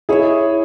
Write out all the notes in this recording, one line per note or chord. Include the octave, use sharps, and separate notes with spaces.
E4 G#4 C#5 E5